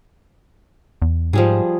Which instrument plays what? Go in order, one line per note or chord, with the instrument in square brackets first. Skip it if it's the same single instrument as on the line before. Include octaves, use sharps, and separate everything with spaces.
[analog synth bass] E2
[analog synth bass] G#2 [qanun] F3 G3 G#4